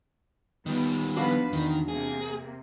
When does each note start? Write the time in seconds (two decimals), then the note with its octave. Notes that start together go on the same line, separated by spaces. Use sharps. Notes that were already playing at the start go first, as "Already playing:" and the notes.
0.66 D#3 G3 B3
1.16 F3 B3 D4 F#4 B4 F5
1.53 E2 A#2 D#3
1.88 C3 A#3 G#4